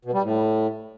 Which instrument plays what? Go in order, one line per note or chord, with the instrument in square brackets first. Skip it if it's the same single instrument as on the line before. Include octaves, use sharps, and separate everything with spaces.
[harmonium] B2
G3
A2